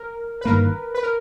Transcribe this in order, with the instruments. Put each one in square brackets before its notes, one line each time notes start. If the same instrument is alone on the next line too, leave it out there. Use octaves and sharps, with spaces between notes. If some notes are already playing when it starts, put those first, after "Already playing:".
Already playing: [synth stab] A#4
B4
[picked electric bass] G1 G2 D#3 A#3 [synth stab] A#4
[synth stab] B4
A#4